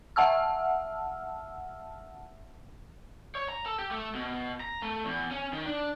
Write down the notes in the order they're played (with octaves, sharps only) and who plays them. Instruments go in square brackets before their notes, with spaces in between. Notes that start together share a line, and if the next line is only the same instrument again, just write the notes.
[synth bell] E5 F#5 A5 E6 F6
[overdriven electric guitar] C#5
A#5
A4
G4
A3
B2
A#5
A3
E2
C#4
D#3
D4